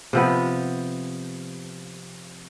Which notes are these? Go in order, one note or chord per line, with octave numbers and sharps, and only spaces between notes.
C3 F3 B3